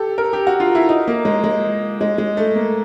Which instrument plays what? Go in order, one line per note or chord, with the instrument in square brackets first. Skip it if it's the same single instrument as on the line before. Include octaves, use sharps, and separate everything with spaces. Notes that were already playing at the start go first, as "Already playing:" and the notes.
Already playing: [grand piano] G4 A4
A#4
G4
F#4
F4
E4
D#4
A#3
G#3
G#3
G#3
G#3
A3
A#3